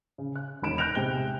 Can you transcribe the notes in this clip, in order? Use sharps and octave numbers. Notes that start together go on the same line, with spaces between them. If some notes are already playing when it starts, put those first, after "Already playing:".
C#3
F#6
E1 D#3 B5 D7 E7
F#6 G6 A#6 D7 F7
C3 G#3 G5 G7